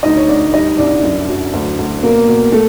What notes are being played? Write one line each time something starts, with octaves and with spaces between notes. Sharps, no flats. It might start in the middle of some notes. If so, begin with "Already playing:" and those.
D2 D#4 D#5
C#5
D2 D4 D5
G3 D#4 D#5
C2 D4 D5
F#2
F#3
D2
D2
B2 A#3 A#4
B2
A3 A4